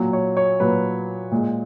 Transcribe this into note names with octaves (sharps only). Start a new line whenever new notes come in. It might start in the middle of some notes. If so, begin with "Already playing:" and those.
Already playing: A#2 F#3
C#5
C#5
A#2 F#3 B4
A#2 G#3